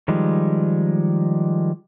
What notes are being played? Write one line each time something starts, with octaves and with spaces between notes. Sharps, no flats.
D#3 F3 G3 G#3